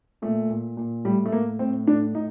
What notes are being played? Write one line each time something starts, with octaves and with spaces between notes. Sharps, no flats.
A#2 A3
A#2
A#2
A2 G3
A3
A2 A#3
A2 C4
A2 D4
A2 D#4